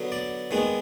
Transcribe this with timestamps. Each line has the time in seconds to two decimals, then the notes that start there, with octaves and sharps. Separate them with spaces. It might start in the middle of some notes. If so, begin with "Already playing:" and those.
Already playing: D3 F#3 B3
0.12 D5
0.51 D#3 G#3 B3